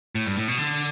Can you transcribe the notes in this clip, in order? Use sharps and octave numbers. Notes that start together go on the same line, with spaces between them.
A2
G2
A2
B2
D3